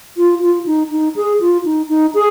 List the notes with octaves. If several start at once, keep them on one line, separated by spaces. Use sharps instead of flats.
F4
F4
D#4
D#4
G#4
F4
D#4
D#4
G#4